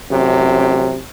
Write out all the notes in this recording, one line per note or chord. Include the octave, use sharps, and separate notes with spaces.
A1 F#2 C3